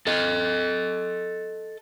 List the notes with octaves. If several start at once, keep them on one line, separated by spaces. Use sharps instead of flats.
A4 D#5